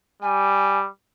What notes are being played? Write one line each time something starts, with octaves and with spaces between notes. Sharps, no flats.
G3 G#5